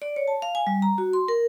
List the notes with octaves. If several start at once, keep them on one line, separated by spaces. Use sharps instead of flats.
D5
C#5
A5
F5
G#5
G3
A#5
F#4
C6
A#4